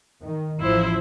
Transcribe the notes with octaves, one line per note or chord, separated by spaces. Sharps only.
D#3
A1 F3 E4 C5